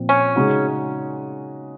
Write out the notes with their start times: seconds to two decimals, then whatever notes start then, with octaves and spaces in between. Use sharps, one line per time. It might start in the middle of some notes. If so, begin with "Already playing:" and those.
Already playing: A#2 F3 C4
0.09 C#4
0.36 C#3 G#3 D#4 F#4